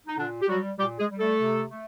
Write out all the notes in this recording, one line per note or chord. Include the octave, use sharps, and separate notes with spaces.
D#4
A#2 D3 D4
G4
F#3 G3 F#4
A#2 G3 G4
G#3 G#4
G3
A3 A4
C3
A3